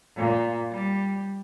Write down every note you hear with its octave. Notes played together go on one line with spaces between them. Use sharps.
A#2
G3